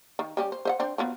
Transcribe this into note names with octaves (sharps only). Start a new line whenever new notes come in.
D#3
G3 C#4 G4
C5
C5 D#5 F#5
C4 D4 C5
F3 F#3 B3